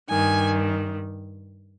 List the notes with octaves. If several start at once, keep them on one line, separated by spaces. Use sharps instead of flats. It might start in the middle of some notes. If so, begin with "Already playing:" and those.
G2 D#3 G#5